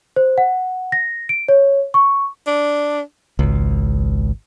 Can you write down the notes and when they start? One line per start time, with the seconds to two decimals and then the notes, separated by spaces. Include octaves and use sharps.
0.16 C5
0.38 F#5
0.92 A#6
1.29 D7
1.49 C#5
1.94 C#6
2.47 D4
3.39 G#1 C#2